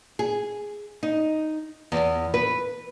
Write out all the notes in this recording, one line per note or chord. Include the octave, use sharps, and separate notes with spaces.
G#4
D#4
E2
B4